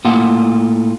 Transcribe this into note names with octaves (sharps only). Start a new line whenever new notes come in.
A2 A#3 F4 F#5